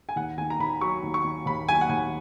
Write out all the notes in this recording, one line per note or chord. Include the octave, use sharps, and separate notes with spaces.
G#5
D#2 F#5
D#3 G#5
A#5
D#2 B5
F#3 C#6
D#2
C#6
D#3
D#2 B5
F#3 G#5
F#5
D#2 G#5